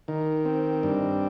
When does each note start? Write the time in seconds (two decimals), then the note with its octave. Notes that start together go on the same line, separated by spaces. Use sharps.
0.08 D#3
0.45 C4
0.83 G2